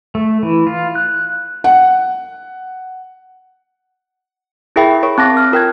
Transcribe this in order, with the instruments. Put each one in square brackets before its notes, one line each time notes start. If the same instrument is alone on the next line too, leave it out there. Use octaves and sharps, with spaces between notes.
[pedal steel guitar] A3
E3
F4
F#6
[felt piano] F#5
[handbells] E4 G#4 A#4 E5 G5 B5
A#4 C#5 C#6
C4 A5 D6 A#6
F6
F4 A#4 G5 F#6 G#6